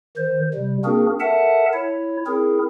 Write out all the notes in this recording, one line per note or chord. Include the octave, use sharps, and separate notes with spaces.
D#3 C5
C3 G3
A#3 C4 D4 F#4 G#4 A#4
A4 A#4 E5 F#5 A5
E4 C#5
C4 E4 G#4 A#4